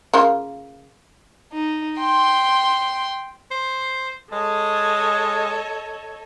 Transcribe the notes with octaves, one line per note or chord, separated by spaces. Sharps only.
C#3 A#3 F4
D#4
G5 C6
C5
G#3 A4 C#5 D#5